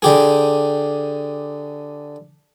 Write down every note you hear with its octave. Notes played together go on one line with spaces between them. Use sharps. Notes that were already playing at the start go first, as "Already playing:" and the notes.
D3 G4 G#4